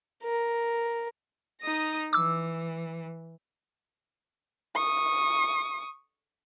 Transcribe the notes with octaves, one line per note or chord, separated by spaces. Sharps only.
A#4
D#4 D#6 A#6
E3 D6 E6
C#6 D#6